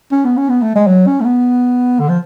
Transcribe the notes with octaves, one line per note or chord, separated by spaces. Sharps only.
C#4
B3
C#4
B3
A3
G#3
F#3
C#4
A3
B3
D3
F3